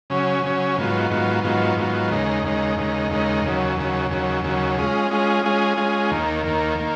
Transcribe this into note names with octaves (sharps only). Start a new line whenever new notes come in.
C#3 F#3 C#4
C#3 F#3 C#4
G#2 D#3 F#3 B3 F4
G#2 D#3 F#3 B3 F4
G#2 D#3 F#3 B3 F4
G#2 D#3 F#3 B3 F4
D#2 C#3 G#3 D#4
D#2 C#3 G#3 D#4
D#2 C#3 G#3 D#4
D#2 C#3 G#3 D#4
D#2 C#3 F#3
D#2 C#3 F#3
D#2 C#3 F#3
D#2 C#3 F#3
G#3 C#4 F4 G#4
G#3 C#4 F4 G#4
G#3 C#4 F4 G#4
G#3 C#4 F4 G#4
D#2 D#3 A#3
D#2 D#3 A#3
D#3 A#3